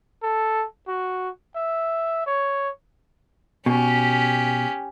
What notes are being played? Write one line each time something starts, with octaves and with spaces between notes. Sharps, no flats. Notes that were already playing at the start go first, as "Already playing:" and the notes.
A4
F#4
E5
C#5
B2 C#4 G4